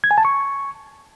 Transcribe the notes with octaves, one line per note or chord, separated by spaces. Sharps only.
G#6
G#5
A5
C#6